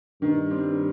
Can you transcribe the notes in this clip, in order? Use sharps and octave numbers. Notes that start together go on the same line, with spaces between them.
G2 D#3
G3 C4